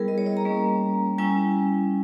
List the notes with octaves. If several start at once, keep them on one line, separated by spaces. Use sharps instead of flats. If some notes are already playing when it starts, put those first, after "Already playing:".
Already playing: G3 B3 E4 G#4 A#4
D#5
C#5
D#5
A#5
G3 A#3 C#4
G3 C#4 E4 G#5